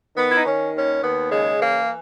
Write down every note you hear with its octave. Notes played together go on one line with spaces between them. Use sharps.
D#3 B3
E4
D#4
D#3 C#4
D#2 C#4
D#2 B3
C#3 G#3
E3 A#3